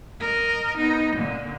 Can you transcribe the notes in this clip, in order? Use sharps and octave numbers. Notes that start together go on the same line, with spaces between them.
A#4 D#5
B3 D#4
A#2 D3